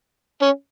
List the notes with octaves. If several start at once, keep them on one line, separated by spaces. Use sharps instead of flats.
C#4